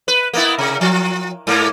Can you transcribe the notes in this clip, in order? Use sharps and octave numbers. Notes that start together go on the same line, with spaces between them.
B4
A#3 B3 E4
C3
F3
G#2 A#3